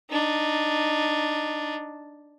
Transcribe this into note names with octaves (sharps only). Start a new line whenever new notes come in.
D4 D#4